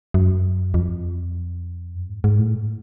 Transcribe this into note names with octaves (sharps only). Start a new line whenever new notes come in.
F#2
F2
F#2
G#2
G#2
A2